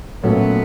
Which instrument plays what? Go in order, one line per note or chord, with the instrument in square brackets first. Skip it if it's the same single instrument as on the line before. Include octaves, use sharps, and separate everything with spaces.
[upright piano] A#2 F#3 A3 C#4 [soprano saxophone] B3